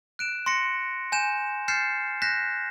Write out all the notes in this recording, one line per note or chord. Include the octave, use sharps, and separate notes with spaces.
F#6 D7 E7
C6 A#6 C#7
G#5 G6 E7
F6 G6 A6 C7 C#7 E7
F#6 G6 A#6 B6 E7